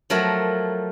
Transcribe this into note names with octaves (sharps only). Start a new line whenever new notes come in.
F3 F#3 A3 A#4